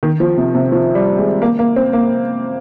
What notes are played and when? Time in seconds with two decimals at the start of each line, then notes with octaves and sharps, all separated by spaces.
0.03 D#3
0.20 F3
0.38 C3
0.55 C3
0.72 F3
0.95 G3
1.18 G#3
1.42 A#3
1.59 A#3
1.76 C4
1.93 A#3